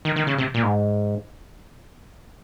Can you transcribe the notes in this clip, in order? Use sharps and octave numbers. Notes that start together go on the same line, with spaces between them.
D#3
D#3
C#3
C3
A#2
G#2